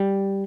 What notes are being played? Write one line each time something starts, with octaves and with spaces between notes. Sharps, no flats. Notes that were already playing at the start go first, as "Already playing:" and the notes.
Already playing: G3